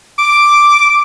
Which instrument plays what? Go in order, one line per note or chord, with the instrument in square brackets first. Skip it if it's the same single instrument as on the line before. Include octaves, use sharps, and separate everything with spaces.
[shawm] D6